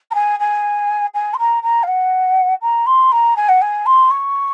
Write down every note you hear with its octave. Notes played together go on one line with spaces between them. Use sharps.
A#5
G#5
G#5
G#5
C6
A#5
A#5
F5
F#5
A#5
C6
A#5
G#5
F#5
G#5
C6
C#6